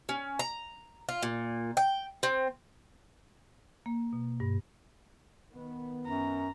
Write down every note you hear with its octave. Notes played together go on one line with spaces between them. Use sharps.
C#4
A#5
F4
A#2
G5
C4
A#3
B2
G2
D#3 B3
F#2 A#5